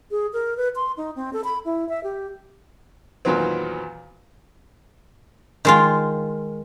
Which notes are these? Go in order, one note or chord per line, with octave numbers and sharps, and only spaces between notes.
G#4
A#4
B4
C6
D#4
C4
A4
B5
E4
E5
G4
E2 A#2 D#3 F#3 B3 C4
D#3 G#3 F4